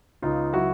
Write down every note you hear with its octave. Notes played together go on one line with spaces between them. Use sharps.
C#2 D#4 F4
F#3 E4 F#4